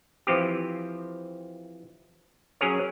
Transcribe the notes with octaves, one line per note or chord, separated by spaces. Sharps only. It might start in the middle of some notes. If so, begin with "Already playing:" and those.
E3 F3 C4 G4
F#3 C#4 G#4 A#4 C#5